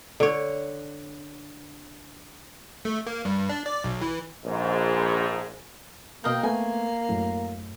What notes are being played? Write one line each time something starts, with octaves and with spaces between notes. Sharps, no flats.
D3 C#5
A3
A#3
G2
D4
D5
B1
E3
A#1 G#2
B2 A#3 A#4 D#5 G5 G6
A3 B3 G#5
F#2 A2